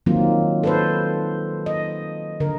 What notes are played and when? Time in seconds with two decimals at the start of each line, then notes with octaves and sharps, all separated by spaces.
0.06 D#3 F#3 A#3 C4 F4
0.63 A4 B4 C5
1.66 D#5
2.40 D3 A#4